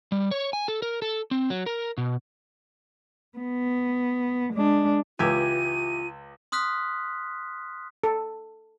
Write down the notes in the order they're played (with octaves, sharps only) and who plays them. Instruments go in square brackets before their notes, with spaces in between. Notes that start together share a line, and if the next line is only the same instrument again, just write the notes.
[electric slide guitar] G3
C#5
G#5
A4
A#4
A4
C4
F#3
A#4
B2
[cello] B3
G#3 D4
[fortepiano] C#2 E6 [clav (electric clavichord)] E3 G4 G#5 [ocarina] F4 [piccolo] D#7
[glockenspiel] C6 D#6 F6 F#6 B6
[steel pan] A4